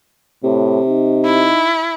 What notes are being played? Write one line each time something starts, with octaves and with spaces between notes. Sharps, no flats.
A2 C3
D#4
E4